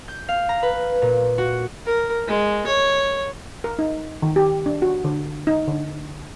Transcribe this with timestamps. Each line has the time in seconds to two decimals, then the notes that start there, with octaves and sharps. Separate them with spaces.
0.08 G6
0.29 F5
0.49 A#5
0.63 B4
1.02 A#2
1.38 F#4
1.86 A#4
2.28 G#3
2.66 C#5
3.64 A#4
3.79 D#4
4.22 D#3
4.36 G4
4.66 D4
4.82 F#4
5.04 D3
5.47 D#4
5.67 D3